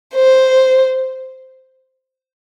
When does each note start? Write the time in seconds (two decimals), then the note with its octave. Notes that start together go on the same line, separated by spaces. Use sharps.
0.15 C5